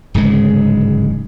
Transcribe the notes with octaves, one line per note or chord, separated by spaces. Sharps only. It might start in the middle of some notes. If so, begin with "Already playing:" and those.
D1 G#2 C#3 G#3